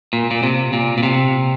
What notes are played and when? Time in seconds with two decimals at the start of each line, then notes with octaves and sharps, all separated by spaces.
0.13 A#2
0.31 A#2
0.43 C3
0.73 A#2
0.98 A#2
1.03 C3